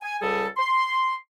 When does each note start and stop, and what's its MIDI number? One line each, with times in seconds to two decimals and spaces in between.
0.02 0.17 80
0.22 0.47 37
0.22 0.47 55
0.22 0.47 68
0.22 0.47 69
0.57 1.15 84